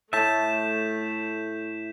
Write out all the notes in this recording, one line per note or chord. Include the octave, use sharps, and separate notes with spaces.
A2 A3 E5 A5 G6 B6 E7